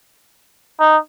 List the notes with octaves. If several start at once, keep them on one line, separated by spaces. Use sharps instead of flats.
D#4